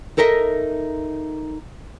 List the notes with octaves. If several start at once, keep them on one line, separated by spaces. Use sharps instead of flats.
D#4 A4 A#4 D#5 E5